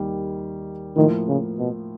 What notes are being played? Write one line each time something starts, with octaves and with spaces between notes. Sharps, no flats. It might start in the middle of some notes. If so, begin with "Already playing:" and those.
Already playing: D#2 D#3 G3
A2 D#3 F3 A#3
C#3
B2